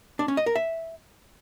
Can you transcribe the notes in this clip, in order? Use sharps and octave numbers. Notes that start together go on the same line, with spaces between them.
D4
C#4
D#5
A#4
E5